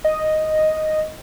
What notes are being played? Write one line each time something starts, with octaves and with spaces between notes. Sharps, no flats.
D#5